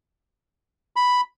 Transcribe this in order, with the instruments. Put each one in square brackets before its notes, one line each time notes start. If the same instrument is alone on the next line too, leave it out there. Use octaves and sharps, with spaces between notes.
[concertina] B5